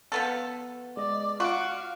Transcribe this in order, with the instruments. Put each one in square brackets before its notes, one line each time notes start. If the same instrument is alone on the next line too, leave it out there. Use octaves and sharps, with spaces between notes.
[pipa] F3 B3 A4
[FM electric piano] G#3 D#5 [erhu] D5
[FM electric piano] F4 D6 [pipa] F#4 [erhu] F5